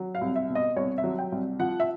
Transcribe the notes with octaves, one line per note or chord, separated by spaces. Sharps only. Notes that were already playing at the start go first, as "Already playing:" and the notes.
Already playing: F#3
F5
C2
E5
B2
D#5
C2 C#5
E5
F#3
G5
C2
F3 F#5
E5